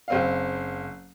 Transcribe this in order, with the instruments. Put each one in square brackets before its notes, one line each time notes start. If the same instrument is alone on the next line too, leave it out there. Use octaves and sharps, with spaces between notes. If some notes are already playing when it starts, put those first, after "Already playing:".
[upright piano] F#1 C4 F5